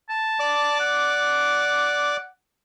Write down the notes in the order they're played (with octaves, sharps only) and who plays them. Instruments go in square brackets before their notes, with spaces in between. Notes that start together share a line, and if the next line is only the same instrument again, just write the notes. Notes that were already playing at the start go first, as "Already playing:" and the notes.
[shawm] A5
[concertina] D5 D6
[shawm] F#5